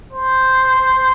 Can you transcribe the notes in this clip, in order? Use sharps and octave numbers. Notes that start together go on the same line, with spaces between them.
C5